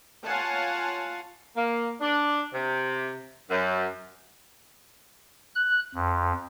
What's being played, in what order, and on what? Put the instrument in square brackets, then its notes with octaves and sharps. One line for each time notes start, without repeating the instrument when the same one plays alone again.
[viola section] F4 C#5 F5 F#5 G#5 A5
[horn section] A#3
D4
C3
F#2
[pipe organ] F#6
F2